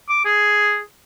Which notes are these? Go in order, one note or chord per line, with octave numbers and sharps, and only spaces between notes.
D6
G#4